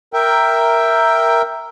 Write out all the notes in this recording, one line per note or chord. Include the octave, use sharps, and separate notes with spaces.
A#4 E5 G5